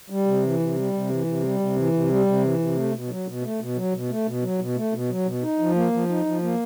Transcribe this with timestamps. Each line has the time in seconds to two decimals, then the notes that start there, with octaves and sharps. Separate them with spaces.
0.10 G3
0.26 C3
0.43 E3
0.59 C3
0.76 G3
0.93 C3
1.09 E3
1.26 C3
1.43 G3
1.60 C3
1.76 E3
1.93 C3
2.10 G3
2.26 C3
2.43 E3
2.59 C3
2.76 A3
2.93 B2
3.09 F#3
3.26 B2
3.42 A3
3.60 B2
3.76 F#3
3.93 B2
4.09 A3
4.26 B2
4.42 F#3
4.59 B2
4.76 A3
4.93 B2
5.09 F#3
5.25 B2
5.42 D#4
5.59 F3
5.75 A#3
5.92 F3
6.09 D#4
6.26 F3
6.42 A#3